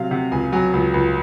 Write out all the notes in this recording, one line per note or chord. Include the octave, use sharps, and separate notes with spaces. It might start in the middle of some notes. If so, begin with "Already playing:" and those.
Already playing: C3 F#3 F5
C3 F#5
C#2 G#5
F#3 G#5
C#2
C#2